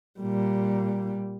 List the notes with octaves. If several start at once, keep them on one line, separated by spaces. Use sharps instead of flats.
A#2 G3